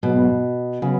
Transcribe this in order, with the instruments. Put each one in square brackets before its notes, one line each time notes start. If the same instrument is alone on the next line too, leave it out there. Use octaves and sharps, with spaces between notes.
[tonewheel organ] G#2 F#3 B3 [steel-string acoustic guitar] B2
[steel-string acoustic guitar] C#3 [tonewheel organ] F#3 B3